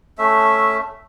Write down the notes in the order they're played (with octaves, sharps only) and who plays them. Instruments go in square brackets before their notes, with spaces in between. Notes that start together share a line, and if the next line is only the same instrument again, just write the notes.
[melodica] A3 C#4 E5